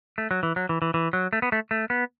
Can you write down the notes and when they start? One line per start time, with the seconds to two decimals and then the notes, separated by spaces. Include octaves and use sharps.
0.18 A3
0.31 F#3
0.43 E3
0.56 F#3
0.69 E3
0.82 E3
0.94 E3
1.13 F#3
1.33 A3
1.42 B3
1.52 A3
1.71 A3
1.90 B3